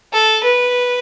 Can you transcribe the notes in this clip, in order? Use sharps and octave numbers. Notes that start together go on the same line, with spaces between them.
A4
B4